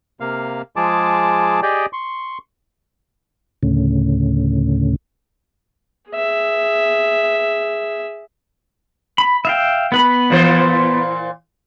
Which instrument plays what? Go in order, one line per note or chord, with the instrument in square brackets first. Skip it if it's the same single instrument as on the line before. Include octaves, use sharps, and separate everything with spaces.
[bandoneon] C3 A#3 F5
F3 G#3 G#4 A5 D6
G4 G#4 D5 D#5 G5
C6 C#6
[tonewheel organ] D2 A2 C#3
[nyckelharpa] G#4 E5
[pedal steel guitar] B5
E5 F5 G5
B3 B4 B5
[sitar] A#2 E3 C5